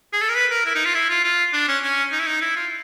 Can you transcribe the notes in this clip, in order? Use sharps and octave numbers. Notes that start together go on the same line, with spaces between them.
G#4
A4
A#4
B4
A#4
E4
D#4
F4
E4
F4
F4
D4
C#4
C#4
D#4
E4
D#4
E4
F4